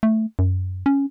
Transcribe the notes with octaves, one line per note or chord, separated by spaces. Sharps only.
A3
F#2
C#4